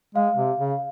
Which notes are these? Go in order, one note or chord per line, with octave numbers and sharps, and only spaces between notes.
G#3 F5
C3
C#3